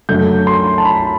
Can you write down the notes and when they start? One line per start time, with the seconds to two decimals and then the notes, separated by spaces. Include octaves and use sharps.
0.09 F#2 D3 F#3 A3 G6
0.47 C6
0.78 A5
0.85 B5